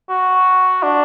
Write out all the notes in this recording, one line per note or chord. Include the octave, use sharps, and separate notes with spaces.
F#4
D4